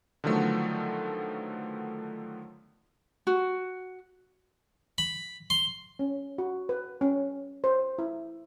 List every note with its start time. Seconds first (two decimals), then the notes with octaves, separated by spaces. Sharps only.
0.24 D3 D#3 F3 F#3 A3 B3
3.27 F#4
4.98 B5
5.50 C6
5.99 C#4
6.38 F#4
6.69 B4
7.01 C#4
7.64 C5
7.99 E4